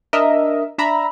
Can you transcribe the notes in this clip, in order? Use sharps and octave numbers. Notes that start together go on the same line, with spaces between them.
D4 A#4 D#5 E5
D4 E5 A#5 B5